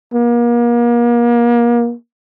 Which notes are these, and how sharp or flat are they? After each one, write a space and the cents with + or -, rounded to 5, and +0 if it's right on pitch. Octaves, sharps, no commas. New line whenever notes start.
A#3 +35